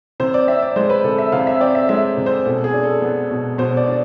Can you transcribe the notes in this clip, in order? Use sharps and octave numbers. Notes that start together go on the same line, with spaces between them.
C3 C5
D5
C4 E5
D5
G#3 C5
B4
C3 A4
E5
C3 F5
E5
C4 D5
E5
G#3 E5
C3
C5
B2 A4
G#4
D4
A4
B3
B2
B2 C5
D5
D4